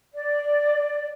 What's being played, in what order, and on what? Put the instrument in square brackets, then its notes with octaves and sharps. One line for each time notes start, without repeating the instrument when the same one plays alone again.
[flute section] D5